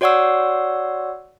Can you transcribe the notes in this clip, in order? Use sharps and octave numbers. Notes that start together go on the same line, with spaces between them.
F#4 C#5 D5 F#5 C#6 E6